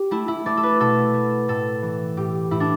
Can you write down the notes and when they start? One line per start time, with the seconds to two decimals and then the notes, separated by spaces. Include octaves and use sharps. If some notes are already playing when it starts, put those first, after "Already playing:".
Already playing: G4
0.11 A3 E4
0.28 E4
0.46 A3 D5
0.57 A4
0.63 B4
0.80 B2 A4
1.14 A3
1.48 A2 A4
1.82 E3
2.17 A2 G4
2.51 A2 E4
2.60 D4